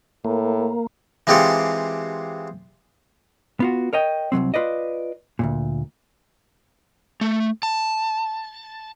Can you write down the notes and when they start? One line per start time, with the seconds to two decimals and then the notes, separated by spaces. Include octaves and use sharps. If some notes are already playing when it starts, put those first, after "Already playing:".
0.25 A2 A#3
1.27 E3 G#3 C4 F4 G4 A4
3.60 B3 F4 F#4
3.93 A#4 C#5 D#5 G5
4.32 C2 C#3 F#3 C4
4.54 F4 B4 D5 D#5
5.39 D2 G2 A#2
7.21 A3
7.63 A5